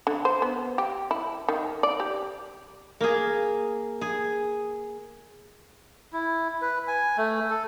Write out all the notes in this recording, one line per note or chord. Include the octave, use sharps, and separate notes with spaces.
D3
C5
B3
G4
E4
D#3
D5
G4
A#3 G#4
G#4
E4
B4
G#5
A3
A4